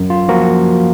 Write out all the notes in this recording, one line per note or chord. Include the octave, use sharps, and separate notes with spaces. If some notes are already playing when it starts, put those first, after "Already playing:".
Already playing: F#2
F4
F3 A#3 F#4 A#4